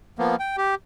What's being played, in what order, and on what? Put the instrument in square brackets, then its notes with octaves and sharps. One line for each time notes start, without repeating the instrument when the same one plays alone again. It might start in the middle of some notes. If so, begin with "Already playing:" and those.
[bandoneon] F3 A#3 B3
G5
G4